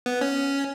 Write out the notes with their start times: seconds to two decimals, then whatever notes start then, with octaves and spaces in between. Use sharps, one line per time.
0.06 B3
0.21 C#4